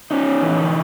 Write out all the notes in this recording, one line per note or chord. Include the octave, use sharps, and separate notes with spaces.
C#4 D#4
E3
D#4